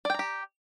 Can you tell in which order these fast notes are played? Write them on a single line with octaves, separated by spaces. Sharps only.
D5 G5 A#5 G4